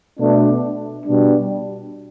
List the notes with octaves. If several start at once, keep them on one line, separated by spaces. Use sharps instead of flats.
B2 A3 D4
B2 G3 D4